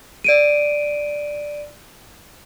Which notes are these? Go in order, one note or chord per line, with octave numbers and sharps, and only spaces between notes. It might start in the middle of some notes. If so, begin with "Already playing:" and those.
D5 D7 D#7